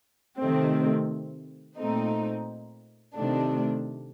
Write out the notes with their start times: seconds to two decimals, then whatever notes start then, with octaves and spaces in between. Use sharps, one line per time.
0.38 C3 D#3 A3 C4
1.77 A#2 A3 C4 D#4
3.14 C3 D#3 A3 D4